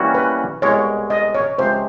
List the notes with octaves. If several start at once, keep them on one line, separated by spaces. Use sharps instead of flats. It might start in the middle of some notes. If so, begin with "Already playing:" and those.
Already playing: E3 G3 A#3 C#4 F#4
B4
C2 B2 G#3 C#5
D#5
C#5
C#2 C3 F3 G#3 C5